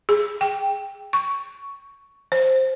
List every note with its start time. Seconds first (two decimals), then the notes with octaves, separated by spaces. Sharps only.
0.09 G#4
0.41 G5
1.13 C#6
2.32 C5